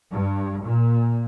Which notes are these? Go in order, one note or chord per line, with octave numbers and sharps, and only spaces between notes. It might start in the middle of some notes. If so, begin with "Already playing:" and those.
G2
A#2